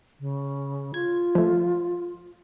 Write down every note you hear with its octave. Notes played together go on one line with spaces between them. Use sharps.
C#3
F4 G#6
F3 A3